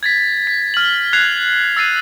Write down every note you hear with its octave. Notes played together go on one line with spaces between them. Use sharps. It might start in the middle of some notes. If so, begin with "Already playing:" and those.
G#6 A6 B6
B6
F6 F#7
F6 F#6 G#6 C7 F7
E6 A6 C7 D#7